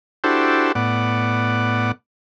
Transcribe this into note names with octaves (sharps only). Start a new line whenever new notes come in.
D4 E4 F#4 G4 A4 C5
A2 B3 D5 F#5